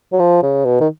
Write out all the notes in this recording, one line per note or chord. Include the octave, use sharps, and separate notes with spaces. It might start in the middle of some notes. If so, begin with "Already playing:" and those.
F#3
F3
C#3
B2
D#3